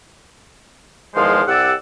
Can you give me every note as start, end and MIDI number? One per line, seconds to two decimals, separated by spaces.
1.15 1.43 40
1.15 1.43 51
1.15 1.43 53
1.15 1.43 56
1.15 1.43 72
1.15 1.43 77
1.48 1.73 36
1.48 1.73 67
1.48 1.73 74
1.48 1.73 78
1.48 1.73 88